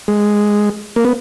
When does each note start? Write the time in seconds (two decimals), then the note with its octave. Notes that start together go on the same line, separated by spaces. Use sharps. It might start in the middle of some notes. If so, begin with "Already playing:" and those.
0.08 G#3
0.96 A#3
1.05 B3